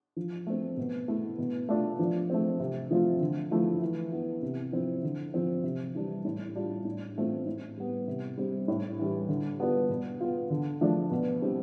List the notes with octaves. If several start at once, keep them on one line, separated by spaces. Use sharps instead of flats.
F3
A3 C4
B2
A3 E4
B2
A3 D4 F4
F3
A3 C4
C3
F3 A3 C4 F4
D3
F3 A3 E4
E3
B3 E4
C3
F3 C4 E4
D3
F3 C4
C3
E3 G3 D4
A2
G3 D4 F4
A2
E3 A3 C4 F4
A2
G3 B3
C3
G3 C4
A2
E3 G3
D3
G3 B3 D4 F4
B2
B3 F4
D3
F3 A3 D4 F4
B2
G3 C4 E4